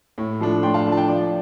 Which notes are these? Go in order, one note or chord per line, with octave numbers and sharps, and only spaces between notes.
A2
F3 A3 D4
A2 G5 C6
F5 A5
F3 A3 D4
A5
D5 G5
F3 D5